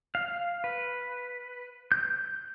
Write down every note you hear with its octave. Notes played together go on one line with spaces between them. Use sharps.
F5
B4
G6